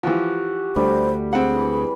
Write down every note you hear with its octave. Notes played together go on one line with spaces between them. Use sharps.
E3 F3 F#4 G4
D2 G3 A3 D4 C5
C4 G#4 F#5
E3